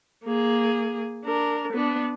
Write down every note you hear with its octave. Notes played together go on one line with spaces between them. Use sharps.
A#3 G#4
D4 A#4
B3 D4